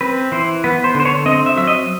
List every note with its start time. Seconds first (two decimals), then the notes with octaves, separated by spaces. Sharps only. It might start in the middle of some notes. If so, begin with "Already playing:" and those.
0.01 C4 B4
0.32 E3 C5
0.64 B3 B4
0.84 C5
0.95 D3
1.00 C5
1.05 C#5
1.26 C4 D#5
1.46 E5
1.56 F#3 E5
1.67 D#5